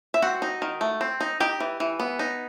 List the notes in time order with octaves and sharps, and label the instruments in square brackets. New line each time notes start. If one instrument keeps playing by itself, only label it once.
[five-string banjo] E5
C4 F#4 F#5
D#4
D#3
A3
C4
D#4
D#4 G4 G5
E3
E3
B3
D#4